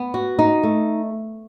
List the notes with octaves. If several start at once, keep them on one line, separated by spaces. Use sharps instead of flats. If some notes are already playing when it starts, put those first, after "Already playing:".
Already playing: B3
F#4
D#4
A3